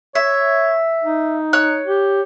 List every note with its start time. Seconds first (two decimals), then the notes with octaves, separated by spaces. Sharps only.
0.15 C#5 E5
1.04 D#4
1.53 C#5 F#6
1.86 G4